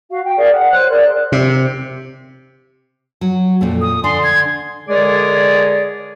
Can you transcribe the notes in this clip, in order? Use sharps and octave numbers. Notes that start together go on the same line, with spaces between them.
F#4 F5
G5
G#4 A#4 D5 F5
F#5
C5 C#5 F#6
G#4 A#4 D5 C6
C3
F#3
F2 A#2 A3
D#6
D3 D5 G#5 C6
G#6
D3 G#3 G#4 A#4 C#5 D5